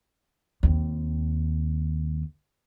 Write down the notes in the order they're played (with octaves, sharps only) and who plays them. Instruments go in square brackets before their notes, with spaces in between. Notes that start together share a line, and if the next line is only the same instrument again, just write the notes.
[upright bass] D#2 C4